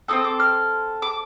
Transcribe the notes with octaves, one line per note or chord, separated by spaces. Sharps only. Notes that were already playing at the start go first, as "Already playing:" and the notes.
C4 D#4 A4 D#6
D6
F6
D6